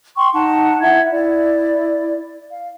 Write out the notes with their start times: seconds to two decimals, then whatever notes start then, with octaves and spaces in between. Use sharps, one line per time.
0.16 G5 C6 C#6
0.33 D#4 F#5 A5
0.81 E4 E5 F#5 G#6
1.10 E4 D5
2.51 F5